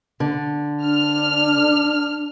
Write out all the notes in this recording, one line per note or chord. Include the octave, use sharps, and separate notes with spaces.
D3
D4 F6